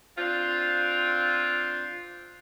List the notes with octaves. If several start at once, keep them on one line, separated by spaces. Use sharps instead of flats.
C4 D4 F4